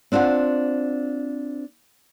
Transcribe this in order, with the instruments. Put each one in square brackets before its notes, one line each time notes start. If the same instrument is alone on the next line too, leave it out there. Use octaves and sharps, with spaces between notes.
[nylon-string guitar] C4 D4 F4 C5 F#5